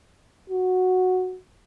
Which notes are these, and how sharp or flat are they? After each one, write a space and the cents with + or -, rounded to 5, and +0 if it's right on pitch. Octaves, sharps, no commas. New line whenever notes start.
F#4 -5